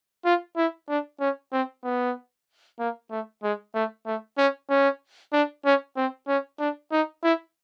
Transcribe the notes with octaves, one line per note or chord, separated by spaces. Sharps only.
F4
E4
D4
C#4
C4
B3
A#3
A3
G#3
A3
A3
C#4
C#4
D4
C#4
C4
C#4
D4
D#4
E4